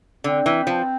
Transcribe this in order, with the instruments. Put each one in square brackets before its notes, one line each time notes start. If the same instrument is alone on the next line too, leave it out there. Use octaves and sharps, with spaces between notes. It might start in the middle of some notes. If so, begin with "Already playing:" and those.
[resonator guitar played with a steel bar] D3 [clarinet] C4
[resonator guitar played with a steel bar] E3
F3